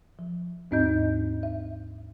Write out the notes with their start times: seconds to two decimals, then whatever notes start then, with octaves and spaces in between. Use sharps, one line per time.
0.19 F3
0.71 D#2 G#2 C4 D#4 D#5 G6
1.43 E5